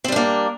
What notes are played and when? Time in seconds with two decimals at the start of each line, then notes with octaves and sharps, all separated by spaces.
0.04 C4
0.08 G3
0.12 D4
0.16 A#3